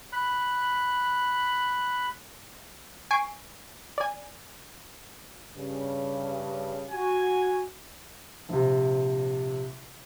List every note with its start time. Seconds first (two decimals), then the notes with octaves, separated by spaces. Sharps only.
0.13 B5 F#6
3.11 G#5 C#6 C7 D7
3.98 D5 G#5
5.55 G2 C#3
6.91 F#4 G#5
8.49 A#1 C3